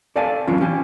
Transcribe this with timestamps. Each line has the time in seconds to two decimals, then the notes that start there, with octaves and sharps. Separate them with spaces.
0.16 A4 D5 E5 F5 G#5 A5
0.47 E3 F#3 C#4 E4 F4
0.61 C#4 G4 G#5